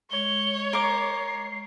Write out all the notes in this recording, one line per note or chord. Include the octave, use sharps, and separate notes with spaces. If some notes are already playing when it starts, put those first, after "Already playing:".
G#3 C#5 G7
A#4 D6 C7